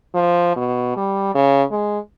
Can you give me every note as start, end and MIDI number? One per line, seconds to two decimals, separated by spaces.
0.15 0.53 53
0.56 0.93 47
0.97 1.34 55
1.35 1.63 49
1.71 1.99 56